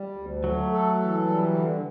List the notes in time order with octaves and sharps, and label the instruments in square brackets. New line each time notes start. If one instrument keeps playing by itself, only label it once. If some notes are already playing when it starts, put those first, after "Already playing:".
Already playing: [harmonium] G3
D2
[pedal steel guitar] F#3 [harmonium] A3
[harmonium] A4
E3
G3
D3